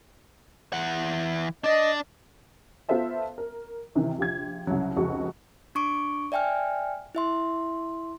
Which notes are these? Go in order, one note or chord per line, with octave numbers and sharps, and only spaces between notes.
E3 F#5
D4 D5 D#5
B3 F4 A4 C5 E5 A5
A#4
C3 D#3 E3
A#1 F4 G4 G#6
C2 C#3 F#3
F1 C#2 F#4 G#4 C#6
D4 C#6 D6 D7
D5 E5 G5 G#5 F6
E4 E5 C6